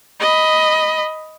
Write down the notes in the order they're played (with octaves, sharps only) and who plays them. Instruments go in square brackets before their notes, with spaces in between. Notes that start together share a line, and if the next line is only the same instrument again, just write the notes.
[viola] D#5 B5